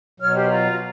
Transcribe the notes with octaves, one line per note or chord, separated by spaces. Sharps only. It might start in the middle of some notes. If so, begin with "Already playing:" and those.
B2 F#3 C#5 F6
G4 C5
F4 A#5